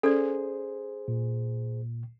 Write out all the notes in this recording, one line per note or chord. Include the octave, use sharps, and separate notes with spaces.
C#4 G#4 A4 C5 D5
A#2